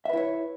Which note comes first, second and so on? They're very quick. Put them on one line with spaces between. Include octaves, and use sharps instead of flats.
E5 B4 E4 C#5